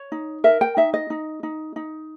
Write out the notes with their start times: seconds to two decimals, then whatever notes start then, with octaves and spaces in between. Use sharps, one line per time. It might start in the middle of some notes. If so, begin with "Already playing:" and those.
Already playing: C#5
0.12 D#4
0.44 A#4 E5
0.61 G5
0.77 D#4 E5
0.94 D#5
1.10 D#4
1.43 D#4
1.76 D#4